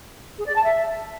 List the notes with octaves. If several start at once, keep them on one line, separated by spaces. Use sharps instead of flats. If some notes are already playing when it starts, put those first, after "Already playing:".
G#4
D5
A5
E5